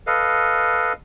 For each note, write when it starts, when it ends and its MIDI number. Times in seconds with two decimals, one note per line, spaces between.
0.07 0.93 69
0.07 0.93 71
0.07 0.93 75
0.07 0.93 77